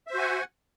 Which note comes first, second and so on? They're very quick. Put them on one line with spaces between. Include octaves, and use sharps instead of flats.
E5 C5 F#4 G#5 F#5